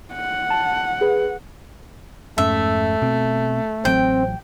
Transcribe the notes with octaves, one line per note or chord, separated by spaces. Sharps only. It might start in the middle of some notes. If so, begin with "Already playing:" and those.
F#5
A5
G#4 B4
F2 G#2 A3 C#4 E5
B2 C4
A1 F#3 C4 G5